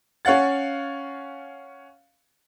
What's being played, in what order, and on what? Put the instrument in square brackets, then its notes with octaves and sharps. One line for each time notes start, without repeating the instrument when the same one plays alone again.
[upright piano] C#4 C#5 F5 F#5 A6